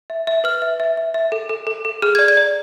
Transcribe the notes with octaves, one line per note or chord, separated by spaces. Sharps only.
E5
E5
B4 F6
E5
E5
E5
E5
A4
A4
A4
A4
G#4 F6
D5 G#6
G#6
D5